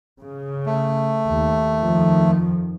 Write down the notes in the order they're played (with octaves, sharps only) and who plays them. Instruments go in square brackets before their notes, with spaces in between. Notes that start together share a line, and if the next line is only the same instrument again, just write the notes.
[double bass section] C#3
[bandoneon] A3
[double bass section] D#2
F2 D#3 F3